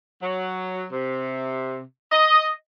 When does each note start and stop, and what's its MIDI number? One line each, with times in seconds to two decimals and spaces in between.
0.22 0.85 54
0.92 1.81 48
2.11 2.49 75